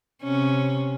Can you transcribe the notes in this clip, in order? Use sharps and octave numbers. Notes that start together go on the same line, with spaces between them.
C3 C#4